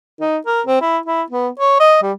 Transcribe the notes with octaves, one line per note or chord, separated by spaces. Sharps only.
D#4
A#4
C4
E4
E4
B3
C#5
D#5
G3